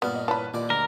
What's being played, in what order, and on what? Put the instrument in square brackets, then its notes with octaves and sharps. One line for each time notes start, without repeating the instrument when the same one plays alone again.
[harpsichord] G2 A#2 F5 [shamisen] B3
[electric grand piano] D#5
[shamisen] E3 B5 [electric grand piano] B4 C#5 A5
[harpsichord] D#2 D5 [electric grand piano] A#2
[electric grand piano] D2 [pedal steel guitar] A#4